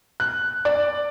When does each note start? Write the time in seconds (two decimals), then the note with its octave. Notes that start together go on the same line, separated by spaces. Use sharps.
0.20 F#6
0.65 D5